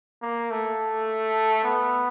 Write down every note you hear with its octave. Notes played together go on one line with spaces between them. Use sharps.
A#3
A3
B3